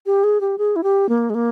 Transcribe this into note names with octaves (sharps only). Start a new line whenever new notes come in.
G4
G#4
G4
G#4
E4
G4
A#3
G#3
A#3